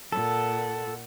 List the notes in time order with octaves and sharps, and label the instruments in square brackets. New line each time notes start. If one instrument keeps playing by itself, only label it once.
[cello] A#2 F#5 [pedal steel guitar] A4